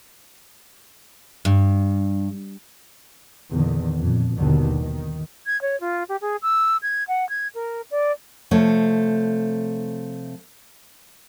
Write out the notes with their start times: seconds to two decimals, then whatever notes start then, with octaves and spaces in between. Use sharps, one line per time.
1.45 G2
3.52 E2 A#2 D3 D#3
3.98 F2 A#2
4.36 G1 D#2 B2 D3 D#3
4.81 D#3
5.46 G#6
5.62 C#5
5.81 F4
6.09 G4
6.21 G#4
6.42 E6
6.82 G#6
7.08 F#5
7.29 G#6
7.55 A#4
7.91 D5
8.51 C3 F3 A3 C#5